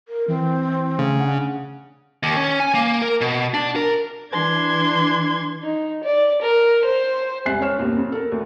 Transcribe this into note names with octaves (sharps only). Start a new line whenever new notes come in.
A#4
E3 C4
C#3 A3
D4 F#5
D#2
C#4
G#5
A#3
A#4
B2
D4
A#4
E3 D4 C6 G#6
D#4
D5
A#4
C5
E1 C2 G#5 F#6 C7
C4 C#5 F6 E7
F#1 D#2 B2 C4
F2
A4 A#4
D2